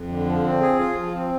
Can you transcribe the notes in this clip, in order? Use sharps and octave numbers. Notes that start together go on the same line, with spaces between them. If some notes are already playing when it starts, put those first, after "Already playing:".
Already playing: F2
D3
F3
C4
G#4
F4
F3
C4